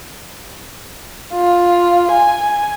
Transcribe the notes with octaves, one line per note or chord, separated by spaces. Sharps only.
F4
G#5